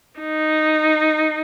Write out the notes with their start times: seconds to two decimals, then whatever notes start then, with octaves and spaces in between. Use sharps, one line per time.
0.20 D#4